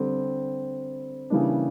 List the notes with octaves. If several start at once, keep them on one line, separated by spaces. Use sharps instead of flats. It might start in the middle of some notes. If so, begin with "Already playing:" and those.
Already playing: D3 G3 C4
C#3 E3 G3 A#3 D4